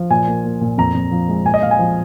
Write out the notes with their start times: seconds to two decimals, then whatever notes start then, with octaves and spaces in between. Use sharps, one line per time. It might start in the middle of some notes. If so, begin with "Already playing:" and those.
Already playing: F3
0.10 A#2 G#5
0.28 A#3
0.44 A#3
0.61 A#2
0.78 F2 A#5
0.95 F2
1.11 F3
1.29 G#3
1.45 A#2 G#5
1.54 D#5
1.63 A#2 F5
1.71 G#5
1.79 F3